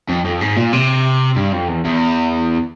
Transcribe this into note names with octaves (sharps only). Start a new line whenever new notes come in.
F2
F2
G#2
A#2
C3
G2
F2
E2
E2